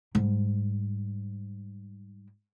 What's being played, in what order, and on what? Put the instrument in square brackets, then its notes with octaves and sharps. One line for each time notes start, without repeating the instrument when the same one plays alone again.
[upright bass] G#2 G3